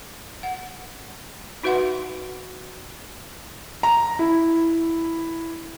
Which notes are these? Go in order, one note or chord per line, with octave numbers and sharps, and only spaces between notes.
F#5
D#4 F#4 B4 E5 F#5 C6
A#5
E4